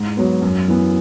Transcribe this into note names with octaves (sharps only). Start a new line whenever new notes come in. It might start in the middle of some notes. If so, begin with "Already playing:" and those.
Already playing: G#2
F#3 B3
F#2
E3 B3